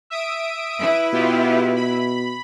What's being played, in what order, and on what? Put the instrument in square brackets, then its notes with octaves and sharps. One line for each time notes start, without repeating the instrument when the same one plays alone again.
[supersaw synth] E5 D#6 D7
[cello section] E4 B4
[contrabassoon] B2 [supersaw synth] B3 F4 G4
[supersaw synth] B5